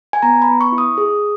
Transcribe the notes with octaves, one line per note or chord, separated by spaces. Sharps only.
G#5
B3 A#5
B5
B3
C#6
E4
D#6
G#4